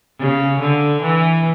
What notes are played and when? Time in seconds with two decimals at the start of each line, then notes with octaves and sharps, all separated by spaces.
0.19 C#3
0.60 D3
1.02 E3